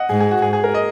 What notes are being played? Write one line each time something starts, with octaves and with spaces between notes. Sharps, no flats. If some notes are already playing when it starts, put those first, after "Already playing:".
Already playing: D#5 F#5
G#2 G#4
G#4
F#4
G#2 G#4
G#4
A#4
D#5